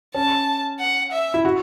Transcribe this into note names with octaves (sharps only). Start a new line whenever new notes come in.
C#4 A5
F#5
E5
E4
F#4